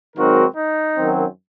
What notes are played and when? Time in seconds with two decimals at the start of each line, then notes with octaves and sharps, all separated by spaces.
0.16 G#2 D#3 F#3 C4 F#4 A#4
0.57 D#4
0.96 F#2 D#3 F#3 C4